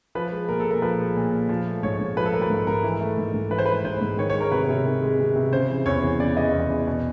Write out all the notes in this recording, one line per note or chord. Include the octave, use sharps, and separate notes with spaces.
F3 B4
G#3
A#2 A#4
A4
A#2
A#4
F3 B4
G#3
A#2
A#2
F3
A3
G#2 C#5
G#2
F3 B4
A4
A3 A#4
B4
G#2
G#2 A#4
E3
A3
G#2
G#2
E3 B4
C5
A3 B4
G#2 C5
G#2
D#3 C#5
C#5
G#3
A#4
C3 B4
C3
D#3
G#3
C3
C3
C#3 C5
E3
E2 C#5
E2
C#3 D5
E3 D#5
E2
E2
B2